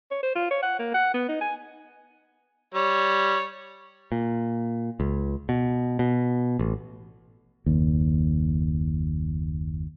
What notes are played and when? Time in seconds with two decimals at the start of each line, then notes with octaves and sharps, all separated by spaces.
0.11 C#5
0.23 C5
0.35 F4
0.51 C#5
0.63 F#5
0.79 A#3
0.94 F#5
1.14 B3
1.29 D#4
1.41 G#5
2.74 G3 C#5
4.12 A#2
5.00 C#2
5.49 B2
5.99 B2
6.59 A1
7.66 F#1 D#2